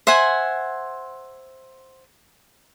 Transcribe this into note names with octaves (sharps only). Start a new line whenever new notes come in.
C5 E5 F#5 G#5